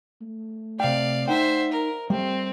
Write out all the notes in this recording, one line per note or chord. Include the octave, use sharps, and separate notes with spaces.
A3
C3 D5 F5 G5
D#4 C5 E5 F#5 G5
A#4
G3 A3 C4